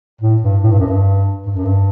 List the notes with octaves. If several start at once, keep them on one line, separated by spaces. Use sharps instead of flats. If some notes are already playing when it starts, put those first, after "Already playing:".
A2
G2
A2
G2
F#2
G2
G2
F#2
G2